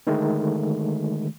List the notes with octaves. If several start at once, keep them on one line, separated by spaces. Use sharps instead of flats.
D3 D#3 G#3 A3